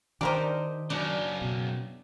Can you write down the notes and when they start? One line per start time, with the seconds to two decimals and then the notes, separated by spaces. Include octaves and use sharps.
0.21 D#3 D4 D#4 G4 A#4 C5
0.90 F#2 C#3 D4
1.42 B2